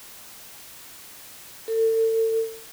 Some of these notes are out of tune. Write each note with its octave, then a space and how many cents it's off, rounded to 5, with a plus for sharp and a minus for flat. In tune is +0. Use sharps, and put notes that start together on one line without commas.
A4 +35